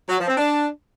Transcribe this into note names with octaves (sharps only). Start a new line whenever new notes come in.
F#3
F3
C4
D4